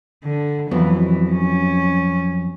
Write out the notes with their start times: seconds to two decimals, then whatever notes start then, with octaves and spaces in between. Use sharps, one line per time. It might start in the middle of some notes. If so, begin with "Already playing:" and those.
0.24 D3
0.71 F2 E3 F#3 B3
1.31 C#4